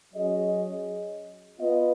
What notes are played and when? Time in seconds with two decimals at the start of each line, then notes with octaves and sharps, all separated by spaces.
0.13 F#3 C#4 G#4 D#5
1.59 B3 F4 B4 D#5